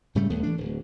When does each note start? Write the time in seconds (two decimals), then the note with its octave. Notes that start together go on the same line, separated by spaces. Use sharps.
0.15 G#2 C#3 G3 A3
0.30 D#1 D#2 A3 B3
0.43 E3 A3 D4
0.58 D1